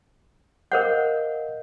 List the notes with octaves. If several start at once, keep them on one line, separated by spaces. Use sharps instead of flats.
A#4 C5 D#5 F5 F#5 G6